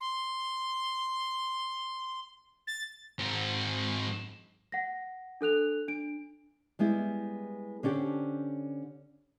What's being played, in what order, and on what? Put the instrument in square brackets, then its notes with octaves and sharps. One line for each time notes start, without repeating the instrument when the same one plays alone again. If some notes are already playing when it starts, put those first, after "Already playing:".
[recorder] C6
A6
[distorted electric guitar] G#2 C4
[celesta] F#5 A#6
D4 A4 F#6 F7
D4 D7
[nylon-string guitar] G3 G#3 B3 E4 G4
D3 C#4 D4 G4 C5